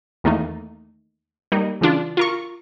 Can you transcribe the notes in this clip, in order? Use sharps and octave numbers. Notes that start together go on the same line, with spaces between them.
E2 D#3 A3 A#3 D#4
G3 A#3 D#4
C#3 E3 D4 F4
F4 A#4 C#6